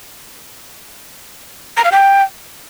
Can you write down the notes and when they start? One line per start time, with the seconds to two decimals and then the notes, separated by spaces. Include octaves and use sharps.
1.77 A#5
1.84 F5
1.92 G5